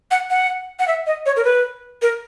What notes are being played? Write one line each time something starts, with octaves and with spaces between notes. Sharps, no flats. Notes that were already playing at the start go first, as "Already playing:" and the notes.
F#5
F#5
F#5
E5
D#5
C#5
A#4
B4
A#4